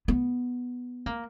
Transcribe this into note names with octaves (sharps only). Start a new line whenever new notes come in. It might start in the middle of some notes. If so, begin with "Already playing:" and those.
B3
A#3